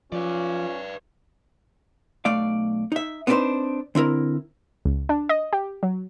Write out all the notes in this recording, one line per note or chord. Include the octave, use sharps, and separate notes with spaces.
F3 C#4 F4 B4 D5
B1 A3 D5 F5
D#4 E5
B3 C4 D4 D#4 B4 C5
D3 C4 E4 A#4
C#2
D4
D#5
G4
F#3